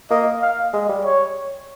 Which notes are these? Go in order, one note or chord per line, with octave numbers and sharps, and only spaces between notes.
A#3 D#5
F5
G#3 D#5
G3
C#5